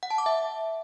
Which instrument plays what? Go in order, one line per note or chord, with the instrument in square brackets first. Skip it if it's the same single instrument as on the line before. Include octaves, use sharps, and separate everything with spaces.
[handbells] F#5
A5
D6
E5